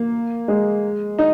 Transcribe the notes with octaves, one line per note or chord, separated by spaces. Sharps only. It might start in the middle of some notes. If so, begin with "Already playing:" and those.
Already playing: A#3
G#3
D#4